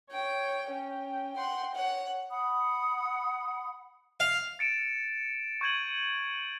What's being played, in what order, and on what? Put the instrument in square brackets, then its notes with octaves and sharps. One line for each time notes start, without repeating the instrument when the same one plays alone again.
[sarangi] C#5 [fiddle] G5
[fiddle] C#4 [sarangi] G5
[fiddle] F#5 C6
C#5 F#5
[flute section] F#5 B5 D#6
[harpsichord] F5
[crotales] A6 C#7 D7 E7
C#6 G6 G#6 D#7 F#7